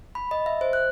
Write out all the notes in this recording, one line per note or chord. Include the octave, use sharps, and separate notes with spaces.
B5
D#5
E5
C5
F#6